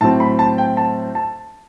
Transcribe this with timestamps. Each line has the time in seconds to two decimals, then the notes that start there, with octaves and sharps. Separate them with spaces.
0.01 A2 F#3 C4 A5
0.20 B5
0.39 A5
0.58 G5
0.77 A5
1.15 A5